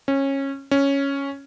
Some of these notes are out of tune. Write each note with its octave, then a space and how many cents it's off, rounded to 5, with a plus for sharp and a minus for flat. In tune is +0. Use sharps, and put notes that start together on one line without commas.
C#4 -20
C#4 +0